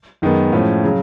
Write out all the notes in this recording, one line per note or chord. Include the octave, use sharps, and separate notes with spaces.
F#2 D#3 G#3 B3
A2 F3 G#3 C#4
C#3 F#3